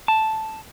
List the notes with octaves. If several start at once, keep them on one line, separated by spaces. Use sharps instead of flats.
A5